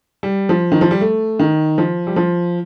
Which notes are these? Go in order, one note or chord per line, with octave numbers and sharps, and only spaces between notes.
G3
F3
D#3
F3
G3
A3
D#3
F3
G3
F3